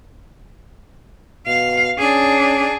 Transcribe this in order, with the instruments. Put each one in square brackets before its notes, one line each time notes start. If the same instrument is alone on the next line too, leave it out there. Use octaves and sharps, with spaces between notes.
[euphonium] B2 [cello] F5
[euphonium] C#4 [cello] D4 G#4